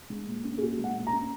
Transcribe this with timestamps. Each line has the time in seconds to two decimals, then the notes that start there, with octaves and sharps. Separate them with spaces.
0.10 G#3
0.27 A#2
0.44 C#4
0.57 G#4
0.61 A#2 F#4
0.79 G#3
0.84 F#5
0.95 A#2
1.07 A#5
1.13 C#4